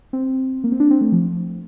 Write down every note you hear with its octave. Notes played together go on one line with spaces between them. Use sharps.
C4
A#3
C4
D4
C4
A3
F3